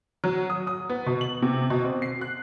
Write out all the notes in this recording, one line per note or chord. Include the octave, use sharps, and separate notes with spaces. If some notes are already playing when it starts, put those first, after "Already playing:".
F#3
D#6
D#6
B3
B2
F#7
C3
B2
C4
C7
F#6